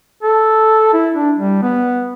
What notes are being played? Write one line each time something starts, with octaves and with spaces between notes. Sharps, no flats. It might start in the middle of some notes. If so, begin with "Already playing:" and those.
A4
E4
D4
G3
B3